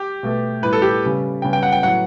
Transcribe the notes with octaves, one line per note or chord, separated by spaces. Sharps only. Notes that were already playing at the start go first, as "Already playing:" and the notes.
Already playing: G4
B2 A3
A2 G3 B3 B4
A4
G4
C#3 G3 B3
C#3 G3 B3 G5
G5
F#5
G5
A2 F#3 B3 F#5